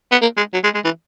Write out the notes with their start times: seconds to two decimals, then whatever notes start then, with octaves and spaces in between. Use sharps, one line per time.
0.12 B3
0.22 A#3
0.37 G#3
0.53 F#3
0.64 G#3
0.74 G#3
0.84 E3